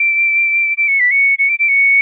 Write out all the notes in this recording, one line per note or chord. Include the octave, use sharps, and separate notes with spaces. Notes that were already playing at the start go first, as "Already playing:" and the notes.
Already playing: D7
D7
C#7
B6
C#7
C#7
D7
D7
C#7